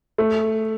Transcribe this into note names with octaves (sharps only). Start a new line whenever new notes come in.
A3